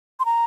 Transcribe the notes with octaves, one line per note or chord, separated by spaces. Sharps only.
C6
A#5